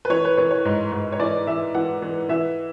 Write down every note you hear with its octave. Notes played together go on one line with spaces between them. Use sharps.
B4
E3 C#5
B4
E3 C#5
C#5
G#2
G#2
C#5
E3 D5
E3 E5
E3 F#5
E3
E3 E5